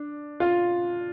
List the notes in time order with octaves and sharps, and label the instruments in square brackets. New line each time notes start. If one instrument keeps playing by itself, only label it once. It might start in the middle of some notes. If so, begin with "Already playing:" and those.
Already playing: [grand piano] D4
F4